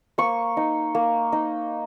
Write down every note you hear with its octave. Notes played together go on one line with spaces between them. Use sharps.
A#3 C#6
D#4
A#3
D#4